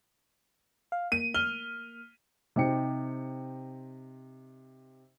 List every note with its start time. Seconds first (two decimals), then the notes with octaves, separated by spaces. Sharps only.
0.92 F5
1.12 A#3 D#7
1.34 F6 G7
2.56 C3 D#4 G4 C5 G5 C#7